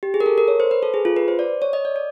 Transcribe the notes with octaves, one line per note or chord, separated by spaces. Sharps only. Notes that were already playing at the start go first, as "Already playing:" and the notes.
G4
G#4
A#4
A4
A#4
C#5
C5
B4
A4
G#4
F4
B4
C5
D5
C#5
D#5
D5
D5